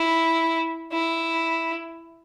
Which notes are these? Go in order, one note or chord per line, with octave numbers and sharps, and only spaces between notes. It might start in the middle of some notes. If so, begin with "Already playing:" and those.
Already playing: E4
E4